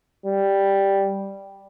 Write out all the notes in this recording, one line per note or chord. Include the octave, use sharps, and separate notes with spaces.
G3